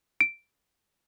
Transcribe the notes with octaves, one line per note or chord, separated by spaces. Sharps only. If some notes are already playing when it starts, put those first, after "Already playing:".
D7